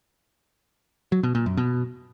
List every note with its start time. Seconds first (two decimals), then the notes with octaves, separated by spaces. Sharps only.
1.12 F#3
1.23 B2
1.35 A#2
1.46 F#2
1.57 B2